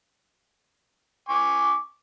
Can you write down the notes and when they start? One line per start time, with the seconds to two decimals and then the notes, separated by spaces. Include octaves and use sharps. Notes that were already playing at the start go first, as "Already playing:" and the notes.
1.29 G#5 C#6 D6